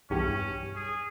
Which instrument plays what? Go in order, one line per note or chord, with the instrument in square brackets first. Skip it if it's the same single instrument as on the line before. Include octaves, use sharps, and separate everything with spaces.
[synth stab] B1 E2 G2 [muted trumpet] C#4
[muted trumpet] G#4